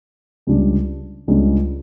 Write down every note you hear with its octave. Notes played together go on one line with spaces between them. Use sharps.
C#2 C#3 G3 D4
C#2 C#3 G3 D4